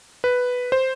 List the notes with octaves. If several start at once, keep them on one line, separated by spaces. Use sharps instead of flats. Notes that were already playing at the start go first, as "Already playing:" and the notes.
B4
C5